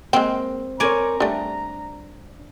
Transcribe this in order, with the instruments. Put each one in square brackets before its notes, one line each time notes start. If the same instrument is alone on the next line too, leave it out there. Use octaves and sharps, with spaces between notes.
[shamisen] G#3 G5 [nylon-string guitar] A#3 [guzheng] C4
[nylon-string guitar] C4 A#4 C#5 [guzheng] D5 G#5 [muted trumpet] A#5
[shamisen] G3 A3 [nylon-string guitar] D4